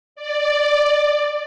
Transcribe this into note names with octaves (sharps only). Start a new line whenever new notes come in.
D5